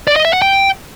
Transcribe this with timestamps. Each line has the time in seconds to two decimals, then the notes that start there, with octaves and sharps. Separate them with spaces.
0.08 D5
0.16 D#5
0.25 E5
0.33 F#5
0.42 G5